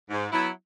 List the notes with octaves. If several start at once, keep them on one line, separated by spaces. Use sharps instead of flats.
G#2
F#3 B3 E4